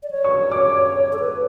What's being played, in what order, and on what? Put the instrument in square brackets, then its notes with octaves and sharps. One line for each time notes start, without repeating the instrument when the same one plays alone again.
[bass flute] D5
C#5
[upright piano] C#6
D6
[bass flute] A4
B4